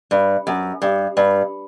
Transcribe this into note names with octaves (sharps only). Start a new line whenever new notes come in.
G2
F#2
G2
G2